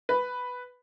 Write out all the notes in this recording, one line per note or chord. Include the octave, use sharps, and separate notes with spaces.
B4